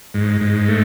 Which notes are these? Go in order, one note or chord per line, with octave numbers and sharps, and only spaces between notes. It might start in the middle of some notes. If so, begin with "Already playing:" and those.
G#2
G#2
A3